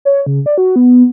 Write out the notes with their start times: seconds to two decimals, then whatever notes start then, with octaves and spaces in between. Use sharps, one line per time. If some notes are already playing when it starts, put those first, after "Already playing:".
0.05 C#5
0.26 C#3
0.46 D5
0.58 F#4
0.76 B3